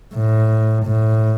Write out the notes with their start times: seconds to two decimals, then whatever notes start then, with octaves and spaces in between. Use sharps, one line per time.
0.15 A2
0.86 A2